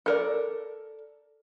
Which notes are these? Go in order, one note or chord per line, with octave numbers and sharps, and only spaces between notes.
A4 A#4 D5